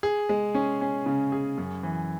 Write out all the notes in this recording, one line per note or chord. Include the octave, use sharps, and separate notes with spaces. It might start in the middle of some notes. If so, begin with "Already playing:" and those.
G#4
G#3
C#4
C#4
C#3
G#4
F#2
E3